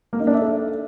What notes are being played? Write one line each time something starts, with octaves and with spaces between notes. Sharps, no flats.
A#3
D#4
D4
E5
A4